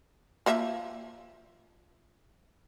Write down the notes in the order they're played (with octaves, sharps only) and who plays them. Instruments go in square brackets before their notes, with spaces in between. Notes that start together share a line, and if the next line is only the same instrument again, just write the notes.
[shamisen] F3 A#3 E5